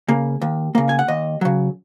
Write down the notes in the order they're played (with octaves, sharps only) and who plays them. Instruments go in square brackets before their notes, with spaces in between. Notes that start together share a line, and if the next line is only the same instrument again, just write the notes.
[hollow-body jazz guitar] C#3 A#3
D#2
C#3 A#3
G#5
F#5
D#2 D#5
C#3 F#3